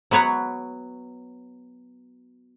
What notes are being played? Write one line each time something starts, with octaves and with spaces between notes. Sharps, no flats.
F#3 B3 B4 C#5 F#5